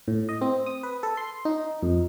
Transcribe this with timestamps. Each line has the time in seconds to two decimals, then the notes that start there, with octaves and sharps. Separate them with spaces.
0.08 A2
0.29 D#5
0.41 C4
0.66 D#6
0.83 B4
1.03 A4
1.17 C6
1.45 D#4
1.83 F2